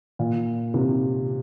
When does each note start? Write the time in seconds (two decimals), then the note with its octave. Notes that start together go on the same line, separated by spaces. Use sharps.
0.19 A#2
0.74 C3